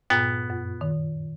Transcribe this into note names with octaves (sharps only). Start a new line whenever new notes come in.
G2 A#2 B3
F#2
D#3